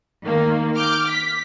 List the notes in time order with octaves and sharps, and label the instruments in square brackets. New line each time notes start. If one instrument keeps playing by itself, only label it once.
[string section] D#3 A#3
D6 F6 G6
B6